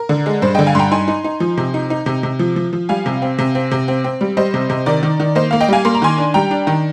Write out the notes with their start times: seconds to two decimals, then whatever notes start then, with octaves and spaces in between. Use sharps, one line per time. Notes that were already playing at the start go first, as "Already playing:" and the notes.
Already playing: A#4
0.09 D3
0.26 G#3
0.42 G2 C5
0.55 D3 D#5 G5
0.67 F5 G#5
0.75 G2 G5 A#5 C6
0.91 D#4 G#5 C6
1.08 D#4
1.24 D#4
1.40 F3
1.57 C3
1.74 D#4
1.90 D#4
2.06 C3
2.23 C3
2.39 F3
2.56 F3
2.73 F3
2.89 G3 F5 G#5
3.06 C3
3.22 C4
3.38 C3
3.55 C4
3.71 C3
3.88 C4
4.04 C4
4.21 G3
4.37 G3 C5 D#5
4.54 C3
4.70 C3
4.86 D#3 A#4 D5
5.03 D#3
5.20 D#3
5.35 A#3 C5 D#5
5.51 A#3 F5
5.60 D#5 G5
5.68 G3 F5 G#5
5.85 A#3 C6
5.95 A#5
6.02 D#3 G#5 C6
6.18 D4
6.34 G3 G5 A#5
6.51 D4
6.67 D#3